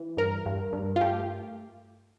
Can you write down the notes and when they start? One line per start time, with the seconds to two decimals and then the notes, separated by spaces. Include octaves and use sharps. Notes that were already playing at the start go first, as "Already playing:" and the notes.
Already playing: E3
0.17 G2 A#4
0.46 G2
0.73 G2
0.96 F4
1.01 A3 G4